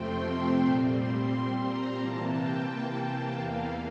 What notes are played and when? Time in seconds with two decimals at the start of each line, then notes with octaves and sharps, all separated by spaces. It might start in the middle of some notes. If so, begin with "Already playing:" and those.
Already playing: F2 C3 F3 A3 C4 G5 C6
0.60 A#2 G3 C4
0.94 C6
1.28 C6
1.62 A#5
1.97 C3 E3 A#3 A5
2.31 G5
2.99 G5
3.34 E2 E3 A#3 F5